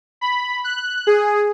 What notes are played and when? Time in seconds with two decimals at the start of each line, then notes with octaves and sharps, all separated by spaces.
0.21 B5
0.64 F#6
1.07 G#4